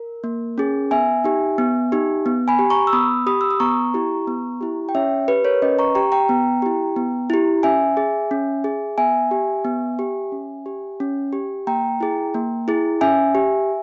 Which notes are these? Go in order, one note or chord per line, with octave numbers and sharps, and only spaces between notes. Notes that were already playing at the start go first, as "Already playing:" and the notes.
Already playing: A#4
A#3
C#4 G#4
B3 E5 G#5
D#4 G4
B3
D#4 G4
B3
G#5 B5
G4
A#5 C#6
E6
B3 B5 D#6
G4 B5 D#6
E6
D#6
B3 A#5 C#6
E4 G4
B3
E4 G4
G5
C#4 C#5 E5
G4 B4
A#4 C#5
C#4 B4 D#5
A#5 C#6
G4 G5 A#5
G5 A#5
B3
E4 G4
B3
E4 G4
C#4 E5 G#5
G#4
C#4
G#4
B3 E5 G#5
G4
B3
G4
C#4
G4
C#4
G4
A#3 G5 A#5
E4 G#4
A#3
E4 G#4
C#4 E5 G#5
G4